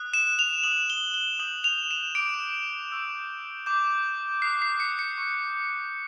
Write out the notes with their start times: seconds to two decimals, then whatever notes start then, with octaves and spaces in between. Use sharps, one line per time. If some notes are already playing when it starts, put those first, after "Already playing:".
Already playing: D#6 F#6
0.14 E7
0.39 F7
0.64 D#6 F#6 F#7
0.90 G7
1.14 G7
1.39 D#6 G6 F#7
1.64 F7
1.91 E7
2.15 D6 G6 D7
2.92 C#6 E6 G6
3.66 D6 G6
4.42 D#6 F#6 C7
4.62 C7
4.80 C#7
4.99 C#7
5.18 C#6 E6 G6